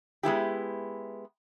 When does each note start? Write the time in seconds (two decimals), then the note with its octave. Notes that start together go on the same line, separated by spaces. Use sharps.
0.23 G#3 B3 E4 G4